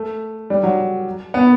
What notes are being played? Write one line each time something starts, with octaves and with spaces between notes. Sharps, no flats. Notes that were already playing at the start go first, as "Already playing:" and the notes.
Already playing: A3
G3
F#3
B3